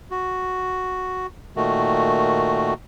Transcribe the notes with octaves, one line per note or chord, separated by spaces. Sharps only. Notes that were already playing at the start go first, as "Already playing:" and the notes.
F#4
A#2 D#3 A3 F#4